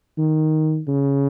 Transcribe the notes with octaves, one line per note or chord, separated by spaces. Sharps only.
D#3
C#3